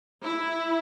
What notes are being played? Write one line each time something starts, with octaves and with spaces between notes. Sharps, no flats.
E4